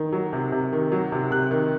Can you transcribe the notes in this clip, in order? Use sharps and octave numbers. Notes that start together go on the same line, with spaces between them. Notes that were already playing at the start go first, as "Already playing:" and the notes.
Already playing: D#3
F#3
C3
C3
D#3
F#3
C3
C3 F#6
D#3